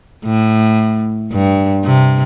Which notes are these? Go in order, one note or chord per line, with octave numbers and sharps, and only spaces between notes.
A2
G2
C3